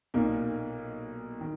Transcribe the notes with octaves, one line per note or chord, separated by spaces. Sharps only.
B1 A#2 A#3 D#4
D#3